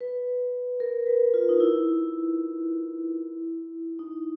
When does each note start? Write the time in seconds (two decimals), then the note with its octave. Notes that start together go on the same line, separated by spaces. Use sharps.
0.01 B4
0.80 A#4
1.06 B4
1.34 F4
1.49 D#4
1.60 E4
3.99 D#4